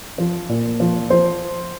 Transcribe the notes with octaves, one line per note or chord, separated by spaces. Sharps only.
F3
A#2
F3
F3 C5